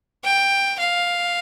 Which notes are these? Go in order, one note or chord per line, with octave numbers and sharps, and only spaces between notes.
G5
F5